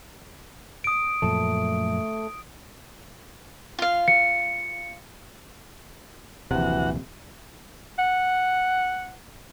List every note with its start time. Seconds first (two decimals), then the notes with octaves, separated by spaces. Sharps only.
0.84 D#6 D7
1.22 F#2 A#2 F3 A3
3.79 F4 F5
4.08 C#7
6.51 D#1 A#1 C3 E3 F#4 F#5
7.99 F#5